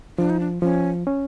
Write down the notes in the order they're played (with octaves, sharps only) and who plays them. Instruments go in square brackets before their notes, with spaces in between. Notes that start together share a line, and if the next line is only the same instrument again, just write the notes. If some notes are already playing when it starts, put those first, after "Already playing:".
[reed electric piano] F3 [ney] D4
[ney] D#4
D4
[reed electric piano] F3 [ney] C#4
[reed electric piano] C#4